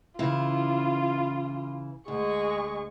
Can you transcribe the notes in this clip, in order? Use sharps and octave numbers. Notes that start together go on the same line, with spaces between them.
C#3 E3 E4 F4
D2 G#3 C#6